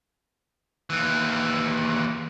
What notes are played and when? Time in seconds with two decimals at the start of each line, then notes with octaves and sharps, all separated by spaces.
0.90 D#2 E3